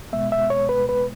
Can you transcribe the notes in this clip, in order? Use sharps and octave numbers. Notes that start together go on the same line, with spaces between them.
B2 G#3 B3 E5
E5
C#5
B4
B4